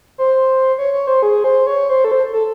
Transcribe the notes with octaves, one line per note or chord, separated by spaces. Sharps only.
C5
C#5
C#5
C5
G#4
C5
C#5
C5
A4
C5
A4